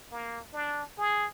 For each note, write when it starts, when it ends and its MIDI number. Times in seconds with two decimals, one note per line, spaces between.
0.12 0.41 58
0.53 0.83 62
0.98 1.26 68